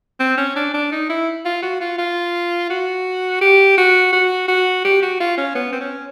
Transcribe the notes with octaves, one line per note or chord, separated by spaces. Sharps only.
C4
C#4
D4
D4
D#4
E4
F4
F#4
F4
F4
F#4
G4
F#4
F#4
F#4
G4
F#4
F4
C#4
B3
C4
C#4